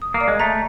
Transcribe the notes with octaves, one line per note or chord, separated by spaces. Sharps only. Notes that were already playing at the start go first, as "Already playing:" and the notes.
D#6
A#3
D5
G#3
A3 A#5